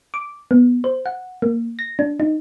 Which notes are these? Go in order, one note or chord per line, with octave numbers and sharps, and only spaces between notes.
D6
B3
C5
F#5
A#3
A#6
D4
D#4